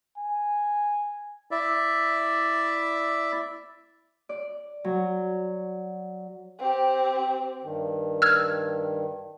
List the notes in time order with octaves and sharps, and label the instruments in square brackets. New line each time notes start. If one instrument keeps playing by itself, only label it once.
[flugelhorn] G#5
[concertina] E4 D5 E5
[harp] D5
F#3
[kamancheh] C4 G4
[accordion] G2 D#3
[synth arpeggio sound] E6 F6 G#6